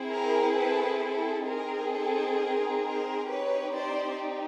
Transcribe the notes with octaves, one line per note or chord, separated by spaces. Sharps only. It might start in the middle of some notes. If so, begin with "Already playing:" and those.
Already playing: C4 E4 G#4
A#4
A4 B4
A4
C4 D#4 G#4 A#4
A4
A#4
A#4 C5
C4 D#4 G4 B4 C#5
C5 D5